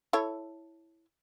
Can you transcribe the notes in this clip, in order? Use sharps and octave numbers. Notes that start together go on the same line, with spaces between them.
E4 A4 C#5